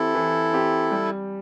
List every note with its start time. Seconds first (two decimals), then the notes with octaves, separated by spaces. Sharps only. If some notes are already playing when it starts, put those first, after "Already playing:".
Already playing: E3 C4 E4 G4 A4
0.15 E3
0.53 C4 G4
0.91 G3